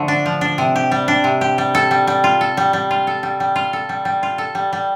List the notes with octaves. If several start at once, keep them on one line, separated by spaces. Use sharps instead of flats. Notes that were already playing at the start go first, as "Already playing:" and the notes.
Already playing: D3 F3 A3
D4
F3
D4
C3
G4
G3
D4
C3
G4
G3
A4
G3
G3
F4
A4
G3
G3
F4
A4
G3
G3
F4
A4
G3
G3
F4
A4
G3
G3